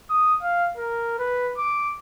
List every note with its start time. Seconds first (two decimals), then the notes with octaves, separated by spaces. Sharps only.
0.10 D#6
0.43 F5
0.77 A#4
1.19 B4
1.58 D6